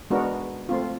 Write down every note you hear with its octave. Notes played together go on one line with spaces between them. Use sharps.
G#3 B3 D4 F#4 A#4
A3 C4 F4